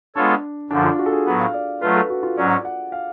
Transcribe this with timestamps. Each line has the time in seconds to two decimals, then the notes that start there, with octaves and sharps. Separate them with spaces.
0.15 G#3 B3 D4 F4 A4 C#5
0.70 F#2 D3 F3 D4
0.84 F4
0.99 F#4
1.06 A4
1.12 G#4
1.25 A2 F#3 B3
1.40 F5
1.54 D5
1.81 F#3 A3 F4 B4
1.95 A4
2.10 F#4
2.23 F4
2.37 G#2 F#3 C#4 D5
2.65 F#5
2.92 F5